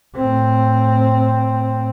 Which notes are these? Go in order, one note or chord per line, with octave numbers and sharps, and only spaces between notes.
A2 C4